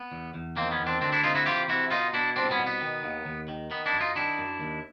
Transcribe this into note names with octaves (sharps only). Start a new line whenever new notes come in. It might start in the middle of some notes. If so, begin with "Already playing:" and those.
Already playing: B3
E2
E2
D#3 A#3 C4
B3 C#4
E2
C4 D4
D2 C4 D4
D4 E4
C3 D#4 F4
E4 F#4
E3 F4 G4
C3 E4 F#4
B2 D#4 F4
B2 D4 E4
C2 C4 D4
B3 C#4
B2
B3
D#3
D#2
D#2
D#3
D#3 B3
D4 E4
F#2
D#4 F4
D#3 D4 E4
F#2
D#2